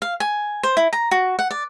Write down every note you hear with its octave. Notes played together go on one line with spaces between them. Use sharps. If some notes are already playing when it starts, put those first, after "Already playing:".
F5
G#5
C5
E4
A#5
F#4
F#5
D5